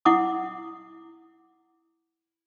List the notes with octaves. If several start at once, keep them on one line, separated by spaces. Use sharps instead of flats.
E4 F#5 D6 D#6